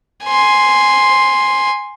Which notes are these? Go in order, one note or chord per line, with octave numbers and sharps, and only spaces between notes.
G#5 C6